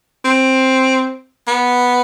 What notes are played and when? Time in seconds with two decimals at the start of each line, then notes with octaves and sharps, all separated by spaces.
0.25 C4
1.47 B3